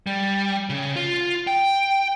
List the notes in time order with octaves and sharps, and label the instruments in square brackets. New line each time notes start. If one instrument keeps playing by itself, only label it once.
[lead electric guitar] G3
C#3
F4
G5